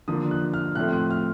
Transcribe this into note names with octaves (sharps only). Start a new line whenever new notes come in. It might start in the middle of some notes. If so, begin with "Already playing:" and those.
D3 F3 A#3 D4 D#6
F#6
F6
A2 F3 A3 C4 F#6
F#6
F6